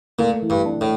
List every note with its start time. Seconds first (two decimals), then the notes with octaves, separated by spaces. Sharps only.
0.19 A#2 A3
0.42 E3
0.50 G2
0.65 D4
0.81 A2